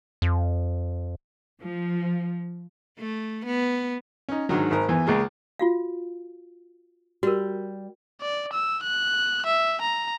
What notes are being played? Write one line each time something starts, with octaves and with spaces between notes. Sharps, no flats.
F2
F3
A3
B3
C#4 D#4
G#2 D3 D#3 F#3
G#1 A#4
E2 E3
C#2 G#3 A#3
F4 F#4 F5
G3 F#4 A#4
D5
E6
F#6
E5
A#5